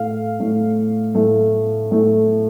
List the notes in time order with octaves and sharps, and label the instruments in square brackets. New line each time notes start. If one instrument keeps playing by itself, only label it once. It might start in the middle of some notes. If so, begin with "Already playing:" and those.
Already playing: [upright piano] A2 A3 F5
A2 A3
A2 A3
A2 A3